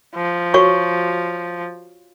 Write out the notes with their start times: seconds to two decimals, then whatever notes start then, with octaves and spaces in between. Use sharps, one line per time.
0.15 F3
0.54 F#4 C#5 C#6